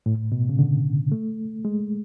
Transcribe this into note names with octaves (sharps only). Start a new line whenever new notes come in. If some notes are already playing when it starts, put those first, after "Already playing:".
A2
B2
C#3
D3
A3
G#3